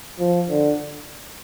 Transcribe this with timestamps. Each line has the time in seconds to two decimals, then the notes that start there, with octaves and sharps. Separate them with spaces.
0.19 F3
0.49 D3